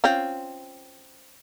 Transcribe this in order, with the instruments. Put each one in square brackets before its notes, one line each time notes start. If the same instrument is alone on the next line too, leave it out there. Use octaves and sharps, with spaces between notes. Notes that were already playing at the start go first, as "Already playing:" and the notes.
[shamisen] C4 C#4 F4